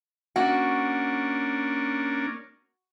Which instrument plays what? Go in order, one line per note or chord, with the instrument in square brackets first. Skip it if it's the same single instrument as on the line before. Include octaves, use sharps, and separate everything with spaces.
[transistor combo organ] A#3 C#4 D4 [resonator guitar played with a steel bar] F#4